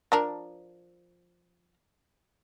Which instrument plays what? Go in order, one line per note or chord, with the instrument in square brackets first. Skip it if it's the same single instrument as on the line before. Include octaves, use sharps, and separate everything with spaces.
[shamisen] F3 D4 A#4